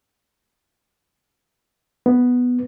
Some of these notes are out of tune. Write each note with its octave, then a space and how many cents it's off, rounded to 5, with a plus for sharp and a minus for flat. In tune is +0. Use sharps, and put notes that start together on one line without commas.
B3 +0